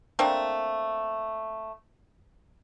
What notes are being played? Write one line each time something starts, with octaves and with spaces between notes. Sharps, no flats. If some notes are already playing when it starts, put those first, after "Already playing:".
A3 A#3 C4 D4